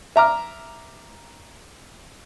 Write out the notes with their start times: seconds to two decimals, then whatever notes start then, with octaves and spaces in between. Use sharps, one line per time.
0.16 E5 A#5 D6 F6